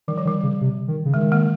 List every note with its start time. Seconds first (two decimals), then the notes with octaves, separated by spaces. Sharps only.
0.08 D#3 G3
0.18 F3
0.25 D#3 G3
0.43 C#3
0.61 C3
0.88 D#3
1.05 C#3
1.14 D#3 G#3
1.32 A#3